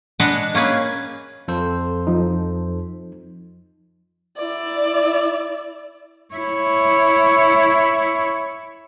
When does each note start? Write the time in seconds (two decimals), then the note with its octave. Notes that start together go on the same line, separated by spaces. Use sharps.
0.19 G#3 D4 B4 D#5 F#5
0.55 A#3 C#4 G#4 B4
1.48 F2 A4 C5
2.07 F3 D#4
4.37 E4 D5
6.35 E4 C#5